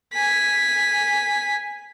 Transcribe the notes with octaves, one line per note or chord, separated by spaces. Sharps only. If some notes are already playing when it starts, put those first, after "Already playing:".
G#5 B6